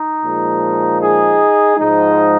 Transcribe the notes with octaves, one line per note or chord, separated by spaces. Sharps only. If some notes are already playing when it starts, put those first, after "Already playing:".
Already playing: D#4
A#2 F3 G#3
D#4 G#4
G#2 F3 G#3 D#4